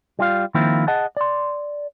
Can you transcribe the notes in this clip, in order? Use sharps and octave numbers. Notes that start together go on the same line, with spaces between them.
G3 F4 F5
D#3 F3 A#3 C4 E4 F4
G#4 D#5 F#5 A5
D5 C6